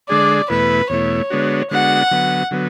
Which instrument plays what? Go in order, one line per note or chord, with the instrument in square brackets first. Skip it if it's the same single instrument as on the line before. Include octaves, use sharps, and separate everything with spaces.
[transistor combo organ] D3 G#3 D4 G#4 [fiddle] D5
[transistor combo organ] E2 B2 A3 E4 [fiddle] B4
[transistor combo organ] E2 B2 A3 E4 [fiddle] C#5
[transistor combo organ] D3 G#3 B3 D4 F#4
[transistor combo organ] D3 G#3 B3 D4 F#4 [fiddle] F#5
[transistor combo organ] D3 F#3 B3
D3 F#3 B3